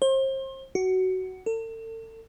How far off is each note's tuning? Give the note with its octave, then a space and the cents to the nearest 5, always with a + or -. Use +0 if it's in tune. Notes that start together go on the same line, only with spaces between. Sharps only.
C5 +35
F#4 +15
A4 +40